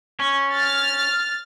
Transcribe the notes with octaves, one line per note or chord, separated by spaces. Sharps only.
C#4
F6 A6